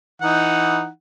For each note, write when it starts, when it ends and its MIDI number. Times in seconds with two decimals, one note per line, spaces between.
0.22 0.88 52
0.22 0.88 63
0.22 0.88 78